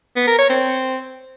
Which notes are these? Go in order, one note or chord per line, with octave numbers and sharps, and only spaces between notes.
B3
A#4
C#5
C4